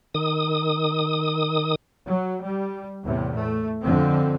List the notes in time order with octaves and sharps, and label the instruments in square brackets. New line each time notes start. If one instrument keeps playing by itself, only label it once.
[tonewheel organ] D#3 D#6
[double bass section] F#3
G3
E2 A2 C3
A3
F2 D3 F3 C4